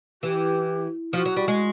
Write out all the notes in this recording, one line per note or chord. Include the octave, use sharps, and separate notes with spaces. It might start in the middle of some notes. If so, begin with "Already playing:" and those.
E3 G4
F3 F#4
F#3
G3
G#3